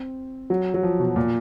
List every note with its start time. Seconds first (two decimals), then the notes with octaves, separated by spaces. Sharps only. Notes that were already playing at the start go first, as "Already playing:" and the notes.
Already playing: C4
0.50 F#3
0.74 F#3
0.83 F3
1.00 B2
1.16 A#2